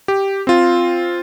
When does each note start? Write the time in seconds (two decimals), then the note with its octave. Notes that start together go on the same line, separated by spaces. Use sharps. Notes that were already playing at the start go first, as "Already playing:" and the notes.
0.08 G4
0.47 C4 F4